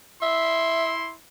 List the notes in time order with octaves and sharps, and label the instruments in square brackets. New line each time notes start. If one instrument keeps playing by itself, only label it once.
[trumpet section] E4 C6 [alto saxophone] E5